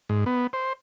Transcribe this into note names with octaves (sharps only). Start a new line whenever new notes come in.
G#2
B3
C5